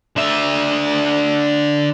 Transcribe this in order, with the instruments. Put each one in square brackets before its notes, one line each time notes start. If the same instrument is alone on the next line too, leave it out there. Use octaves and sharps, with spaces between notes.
[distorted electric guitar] D3 E5